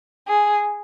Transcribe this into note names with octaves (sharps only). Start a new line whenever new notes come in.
G#4